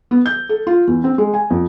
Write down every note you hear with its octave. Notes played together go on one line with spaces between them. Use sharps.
B3
G6
A4
F4
E2
C4
G#3
G#5
F2